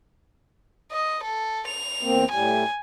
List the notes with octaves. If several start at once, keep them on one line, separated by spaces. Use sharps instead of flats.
D#5
A4
F7
E2 A#3 C4
A2 G3 G#5